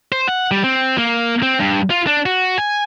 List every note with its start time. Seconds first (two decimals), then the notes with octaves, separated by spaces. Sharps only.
0.12 C5
0.28 F#5
0.51 G3
0.64 C4
0.98 A#3
1.43 C4
1.60 G2
1.90 F4
2.07 D4
2.26 F#4
2.58 G#5